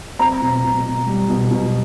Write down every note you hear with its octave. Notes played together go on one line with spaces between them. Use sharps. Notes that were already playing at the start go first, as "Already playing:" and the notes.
C4 A#5
B2
B2
B2
G3
B2
B2